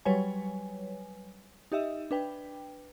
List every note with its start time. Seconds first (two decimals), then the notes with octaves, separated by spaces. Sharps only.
0.05 F#3 G3 B4 C#5 G#5
1.72 D#4 G4 D#5 E5
2.11 D4 B4 G5